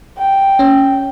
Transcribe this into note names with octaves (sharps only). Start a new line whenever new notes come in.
G5
C#4